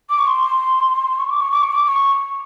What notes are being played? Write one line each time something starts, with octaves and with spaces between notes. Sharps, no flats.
D6
C#6
C6
C#6
D6
C#6
D6
C#6
D6
D6
C#6